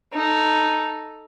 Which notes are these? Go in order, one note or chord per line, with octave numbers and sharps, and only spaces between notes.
D#4 A4